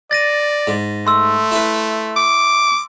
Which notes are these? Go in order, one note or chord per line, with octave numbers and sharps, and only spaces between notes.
D5 A6 A#6 D#7
G#2
A3 C6 E6
E4 B4
D6